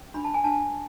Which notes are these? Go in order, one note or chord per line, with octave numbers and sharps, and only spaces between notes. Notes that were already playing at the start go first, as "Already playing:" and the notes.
Already playing: C#4
D4 B5
A5
G#5
D4 A5